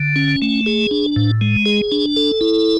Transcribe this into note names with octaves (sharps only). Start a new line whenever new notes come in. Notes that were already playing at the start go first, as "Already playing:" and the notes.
Already playing: D3
C#4
A3
G#4
D4
A2
G#3
G#4
D4
A4
E4